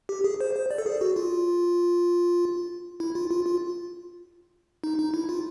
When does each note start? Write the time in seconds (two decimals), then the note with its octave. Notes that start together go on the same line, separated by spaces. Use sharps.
0.09 G4
0.24 G#4
0.41 C5
0.55 C5
0.71 D5
0.78 A4
0.86 G#4
1.01 F#4
1.16 F4
3.00 E4
3.15 F4
3.30 F4
3.46 F4
4.84 D#4
4.99 D#4
5.14 E4
5.29 F4